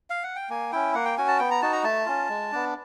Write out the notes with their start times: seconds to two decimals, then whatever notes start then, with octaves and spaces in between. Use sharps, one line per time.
0.10 F5
0.23 F#5
0.36 G5
0.49 A#3 G#5
0.72 C#4 E4 G5
0.95 A#3 F#5
1.05 G5
1.18 C#4 F#4 G#5
1.28 A5
1.39 B3 G5
1.51 A#5
1.62 D#4 F#4 A5
1.72 A#5
1.84 A3 A5
2.06 C#4 F4
2.29 G#3
2.52 B3 D4